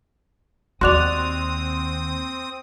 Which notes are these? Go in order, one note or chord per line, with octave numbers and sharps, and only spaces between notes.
D#2 C4 F#4 D5 C6 D#6 F#6 F7